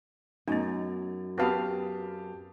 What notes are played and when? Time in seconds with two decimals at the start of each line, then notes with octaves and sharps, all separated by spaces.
0.48 F#2 A3 B3 D#4
1.38 B3 C4 F#4 G4 B4 F5 A5 D#6